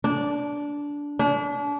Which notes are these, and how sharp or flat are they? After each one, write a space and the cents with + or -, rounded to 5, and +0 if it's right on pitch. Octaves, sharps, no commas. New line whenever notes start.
D4 -15
D4 -35